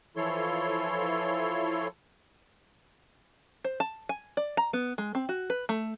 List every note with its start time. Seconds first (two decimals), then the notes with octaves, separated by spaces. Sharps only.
0.16 E3 F3 E4 A4 C#5 C6
3.64 C5
3.80 A5
4.09 G#5
4.37 D5
4.57 A#5
4.73 B3
4.98 G#3
5.15 C4
5.29 F#4
5.50 B4
5.69 A3